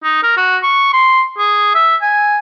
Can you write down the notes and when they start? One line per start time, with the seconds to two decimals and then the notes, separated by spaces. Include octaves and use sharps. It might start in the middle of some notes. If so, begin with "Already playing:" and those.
0.04 D#4
0.23 A#4
0.37 F#4
0.63 C#6
0.94 C6
1.38 G#4
1.75 E5
2.02 G#5